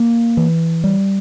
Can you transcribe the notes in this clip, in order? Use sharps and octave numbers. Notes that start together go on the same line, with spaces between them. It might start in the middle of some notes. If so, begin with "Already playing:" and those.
Already playing: A#3
E3
G3